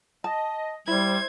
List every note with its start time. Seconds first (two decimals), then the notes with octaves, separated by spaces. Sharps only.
0.24 D#5 A5
0.88 G3 E4 C5 G#6